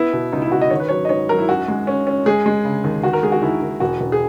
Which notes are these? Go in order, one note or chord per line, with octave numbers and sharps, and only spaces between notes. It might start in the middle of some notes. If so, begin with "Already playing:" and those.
Already playing: B3 E4
B2
C#2 D#4
E4
C#2 F#4
D#5
D#3 C#5
B4
F#3 C#5
D#5
G#2 C#5
F#3 A#4
E4
F#2 F#4
G#3
C#4
C#4
G#3 G#4
G#3
C#3
D#2
D#3 F#4
A#4
G#3 G#4
F#4
D#2 E4
D#2
E1 F#4
E1
G#4